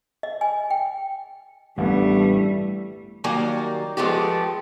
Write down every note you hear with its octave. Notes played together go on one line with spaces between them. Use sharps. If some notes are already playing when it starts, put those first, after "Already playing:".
D#5
G#5
G5
A1 G2 E3 G3 A3 B3
D#3 F#3 G3 A#3
F3 G#3 A3 B3 G4